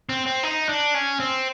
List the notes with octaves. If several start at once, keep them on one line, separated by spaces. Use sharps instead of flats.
C4
C4
D#4
D4
C#4
C4